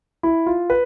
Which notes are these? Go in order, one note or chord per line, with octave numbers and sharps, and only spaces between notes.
E4
F4
B4